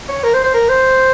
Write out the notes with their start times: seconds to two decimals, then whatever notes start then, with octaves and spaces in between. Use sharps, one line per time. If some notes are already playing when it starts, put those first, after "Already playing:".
0.08 C#5
0.24 A#4
0.34 C5
0.44 C5
0.54 A#4
0.69 C5